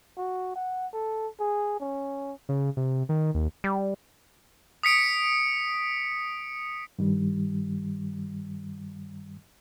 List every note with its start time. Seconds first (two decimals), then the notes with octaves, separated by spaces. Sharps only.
0.17 F#4
0.56 F#5
0.93 A4
1.40 G#4
1.80 C#4
2.49 C#3
2.77 C3
3.09 D#3
3.35 D#2
3.64 G3
4.83 D#6 B6 C#7 D7
6.99 G2 D#3 G3